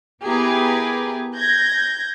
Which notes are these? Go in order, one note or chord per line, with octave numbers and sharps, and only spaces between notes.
B3 E4 G4 G#4 A#4 B4
G6 G#6 A#6